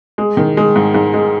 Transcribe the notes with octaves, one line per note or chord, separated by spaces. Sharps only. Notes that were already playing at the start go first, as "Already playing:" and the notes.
G#3
D#3
G#3
G#2
G#2
G#3